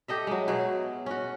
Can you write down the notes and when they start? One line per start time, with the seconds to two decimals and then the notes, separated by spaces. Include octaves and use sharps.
0.08 G4 A4 D#5 E5
0.27 F#3 G#3
0.48 B2 F#3 G#4
1.06 C#4 F#4